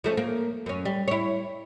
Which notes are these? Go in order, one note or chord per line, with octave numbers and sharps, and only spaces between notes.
F3 A3 C#4
A#3
F#2 C#4
G3
E4 C#5